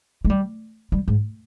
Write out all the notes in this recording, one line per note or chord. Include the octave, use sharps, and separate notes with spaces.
G#3
G3
G3
G#2